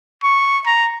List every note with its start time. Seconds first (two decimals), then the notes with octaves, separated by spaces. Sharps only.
0.23 C#6
0.67 A#5